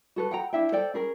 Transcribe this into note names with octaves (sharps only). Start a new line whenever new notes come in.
F#4 A4 B4
F#5 G5 A#5
D4 E4 E5 G5
A4 C5 D5 G5
C#4 G#4 A#4